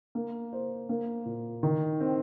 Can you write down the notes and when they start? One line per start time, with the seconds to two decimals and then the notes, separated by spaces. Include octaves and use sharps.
0.15 A#3
0.53 C5
0.89 A#3
1.25 A#2
1.63 D#3
2.01 C4